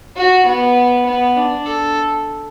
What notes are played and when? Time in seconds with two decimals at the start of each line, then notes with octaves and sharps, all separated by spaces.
0.16 F#4
0.46 B3
1.06 B3
1.37 D4
1.66 A4